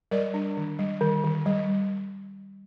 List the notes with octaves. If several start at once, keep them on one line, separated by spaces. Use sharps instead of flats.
G3 A#4 D5
D4
D#3
G3
D#3
D#3
G3